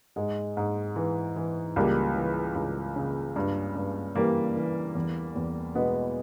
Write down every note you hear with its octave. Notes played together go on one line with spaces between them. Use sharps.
G#2 G#3
G#2
E3
E3
C#2 G3 A#3
E3
C#2
C#3
G2
G2
E3 G3 A#3
E3
E2
E2
B2 G#3 B3